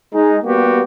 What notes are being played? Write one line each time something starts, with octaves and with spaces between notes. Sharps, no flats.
G#3 D#4
G3 A#3 B3 F#4 G4